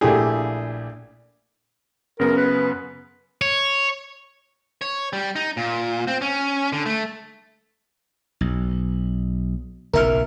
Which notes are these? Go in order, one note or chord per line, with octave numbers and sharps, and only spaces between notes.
A#1 A#2 A3 E4 G4 G#4
F#2 C#3 B3 A#4
B4
C#5
C#5
G3
D#4
A#2
C4
C#4
D3
A3
B1
F#1 B1 A#2 A#4 E5 F6